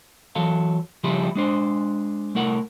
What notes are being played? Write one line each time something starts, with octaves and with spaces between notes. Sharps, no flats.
E3 F#3 A4 F5
C#3 F3 G3 E4 G4 G#4
G#3 D4 C5
C2 A3 E4 A#4 F#5